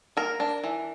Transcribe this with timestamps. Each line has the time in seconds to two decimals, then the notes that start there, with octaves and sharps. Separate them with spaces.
0.17 A#3 A#4
0.40 D4
0.64 E3